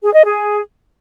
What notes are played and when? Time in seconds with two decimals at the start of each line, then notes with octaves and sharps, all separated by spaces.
0.02 G#4
0.13 D#5
0.25 G#4